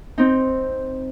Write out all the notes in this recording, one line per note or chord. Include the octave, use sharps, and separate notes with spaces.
C4 D#4